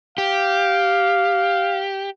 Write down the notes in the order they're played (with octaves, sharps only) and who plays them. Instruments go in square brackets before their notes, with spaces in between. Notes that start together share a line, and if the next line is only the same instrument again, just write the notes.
[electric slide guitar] G4 [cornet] F5